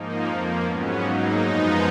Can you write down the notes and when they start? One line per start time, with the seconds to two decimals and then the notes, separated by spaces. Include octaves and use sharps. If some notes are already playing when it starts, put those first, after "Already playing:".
Already playing: G#2 F3 A#3 D#4
0.26 F2 F3 A#3
0.64 G#2 F#3 B3 C#4
1.02 G#2 F#3 A#3 D#4
1.40 F#2 F3 G#3 B3